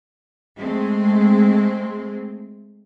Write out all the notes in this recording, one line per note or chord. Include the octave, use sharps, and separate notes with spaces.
G#3 A3 C4